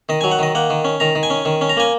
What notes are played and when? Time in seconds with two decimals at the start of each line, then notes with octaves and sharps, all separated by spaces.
0.09 D#3 D#5
0.21 G#5
0.24 F#3
0.31 F#5
0.39 D#3 D#5
0.55 A#3 F#5
0.70 D#3
0.85 C#4
1.00 D#3 A#5
1.15 D#3
1.23 G#5
1.30 C#4
1.45 D#3
1.61 C#4
1.69 A#5
1.77 A#3 G#5